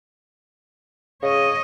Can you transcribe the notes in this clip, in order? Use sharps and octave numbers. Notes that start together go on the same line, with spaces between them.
C#3 C#5 D#5